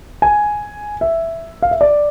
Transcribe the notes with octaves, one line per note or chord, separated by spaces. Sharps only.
G#5
E5
F5
E5
D5